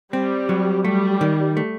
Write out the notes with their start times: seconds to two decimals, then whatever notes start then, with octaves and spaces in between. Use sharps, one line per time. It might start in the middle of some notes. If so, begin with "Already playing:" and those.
0.12 G3 C4
0.49 F#3
0.85 G3 A3
1.21 D#3
1.57 A3